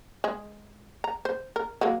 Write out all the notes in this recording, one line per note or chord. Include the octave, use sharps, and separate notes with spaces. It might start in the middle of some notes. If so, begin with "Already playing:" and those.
G#3 G#4
A#5
C5
A#4
F#3 G#3 A#3